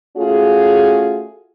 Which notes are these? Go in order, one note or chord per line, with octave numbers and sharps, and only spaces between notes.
A3 C#4 F4 F#4 G#4